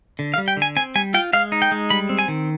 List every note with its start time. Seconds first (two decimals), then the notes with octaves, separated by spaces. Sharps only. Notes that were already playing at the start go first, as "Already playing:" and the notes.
0.19 D3
0.34 F5
0.38 G3
0.48 G5
0.57 D3
0.62 G#5
0.76 C4 G#5
0.95 G3 G#5
1.14 F4 G5
1.33 G#3 F5
1.52 D#4
1.62 G5
1.72 G#3
1.90 G3 B5
2.09 C4
2.19 G#5
2.28 D#3